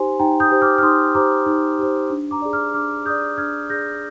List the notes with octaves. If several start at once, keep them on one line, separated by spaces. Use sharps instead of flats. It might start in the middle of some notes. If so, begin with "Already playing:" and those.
Already playing: D#4 G4 C5 G#5 C6
D#4 G5 A#5
D#6 G6
G4 C5
D6 F6
F6
D#4 C6 D#6
G4 C5 A#5 D6
D#4
G4 C5
D4
A#5 D6
G#4 D5
D6 F6
D4 D6 F6
G#4 D5 D#6 G6
D4 F6 G#6
G#4 D5 G6 A#6